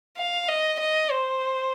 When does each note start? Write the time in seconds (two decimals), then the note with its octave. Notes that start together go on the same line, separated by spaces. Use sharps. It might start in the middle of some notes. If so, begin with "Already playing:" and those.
0.17 F5
0.48 D#5
0.80 D#5
1.11 C5